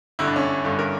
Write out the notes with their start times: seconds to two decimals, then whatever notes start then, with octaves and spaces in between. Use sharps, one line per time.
0.19 G1 G2 D3 E4
0.28 D4
0.36 C#4
0.44 D4
0.64 G1 G2 D3
0.79 A#4